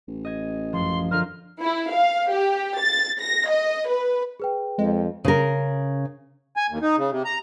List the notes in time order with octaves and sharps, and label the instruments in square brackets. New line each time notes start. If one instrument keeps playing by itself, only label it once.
[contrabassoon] A1
[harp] D#5 G#6
[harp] F#2 F3 [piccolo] C6
[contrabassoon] D3 [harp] F4 A#4 C5 [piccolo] F6
[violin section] E4
F5
G4
A6
A#6
D#5
B4
[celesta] G#4 B4 G5
[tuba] F2 [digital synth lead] G#3
[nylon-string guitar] C#3 A#4
[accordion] G#5
D#2
D#4
C#3
C3
A#5